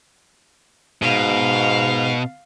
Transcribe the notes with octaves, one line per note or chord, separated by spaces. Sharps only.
G#2 B2 F5